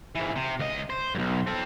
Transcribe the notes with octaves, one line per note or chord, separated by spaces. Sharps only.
G#2 E3
C3
C#2 D#5
C5
B1 F#2
C4 A4